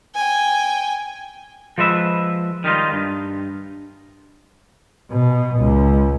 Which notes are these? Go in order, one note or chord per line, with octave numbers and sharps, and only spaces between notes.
G5 G#5
F3 G#3 B4 E5
D#3 G3 D#4 F4
G2
B2
C#2